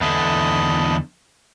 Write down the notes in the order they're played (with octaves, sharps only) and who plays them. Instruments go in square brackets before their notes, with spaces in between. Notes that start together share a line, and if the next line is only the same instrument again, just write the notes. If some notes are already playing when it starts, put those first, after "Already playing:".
[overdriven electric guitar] E2 D3 [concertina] D#5 A5 B5